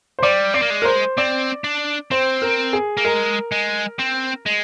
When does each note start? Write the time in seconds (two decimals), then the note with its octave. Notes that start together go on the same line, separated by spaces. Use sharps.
0.19 C5
0.23 G3 D5
0.54 C4 D5
0.62 A#3
0.70 G#3
0.82 A#4
0.85 C5
1.17 C4 D5
1.64 D4
2.11 C4 C5
2.42 A#4
2.73 G#4
2.97 A#3
3.05 G#3 A#4
3.52 G#3
3.99 C4
4.46 G#3